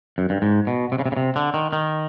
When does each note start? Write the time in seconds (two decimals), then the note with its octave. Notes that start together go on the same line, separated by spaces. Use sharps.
0.18 F#2
0.30 G2
0.42 G#2
0.67 B2
0.92 C3
0.99 C#3
1.06 C3
1.12 C#3
1.17 C3
1.36 D3
1.54 D#3
1.73 D#3